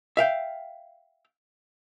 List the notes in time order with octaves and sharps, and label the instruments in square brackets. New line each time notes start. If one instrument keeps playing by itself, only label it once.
[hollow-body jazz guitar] E5 F5 G5